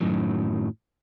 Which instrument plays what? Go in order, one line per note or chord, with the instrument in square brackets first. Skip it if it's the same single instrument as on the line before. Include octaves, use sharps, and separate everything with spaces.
[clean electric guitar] F#2 A2 D#3 F#3